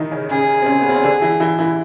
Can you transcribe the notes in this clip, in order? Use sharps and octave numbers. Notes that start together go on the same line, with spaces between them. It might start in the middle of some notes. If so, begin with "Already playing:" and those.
Already playing: D#3 E3 D#4 E4
C#3 C#4
C#3 C#4 G#4
C4
C#3 C#4
B3
C4
C#4
D3 D4
E3 E4
E3 E4
E3 E4